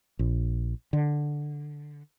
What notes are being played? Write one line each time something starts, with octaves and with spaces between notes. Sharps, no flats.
A#1
D3